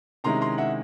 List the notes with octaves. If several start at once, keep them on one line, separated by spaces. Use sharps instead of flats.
C3 D#3 G#3 C#4 E4 A#5 C6
A#5 C6
E5 F#5